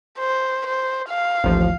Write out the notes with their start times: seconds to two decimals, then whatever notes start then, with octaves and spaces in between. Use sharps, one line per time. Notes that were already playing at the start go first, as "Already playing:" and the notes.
0.18 C5
0.67 C5
1.09 F5
1.44 A1 D#2 F3